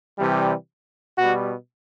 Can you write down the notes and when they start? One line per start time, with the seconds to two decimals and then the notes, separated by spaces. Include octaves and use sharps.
0.18 C3 E3 G3
1.18 B2 G3 F#4